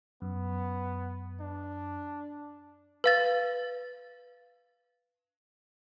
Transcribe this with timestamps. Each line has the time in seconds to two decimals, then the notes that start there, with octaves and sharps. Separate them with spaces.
0.22 F#2 B3
1.40 D4
3.04 B4 F5 A6